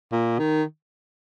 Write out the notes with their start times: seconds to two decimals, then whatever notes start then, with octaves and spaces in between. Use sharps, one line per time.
0.12 A#2
0.39 D#3